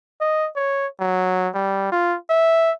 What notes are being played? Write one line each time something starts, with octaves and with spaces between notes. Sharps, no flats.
D#5
C#5
F#3
G3
F4
E5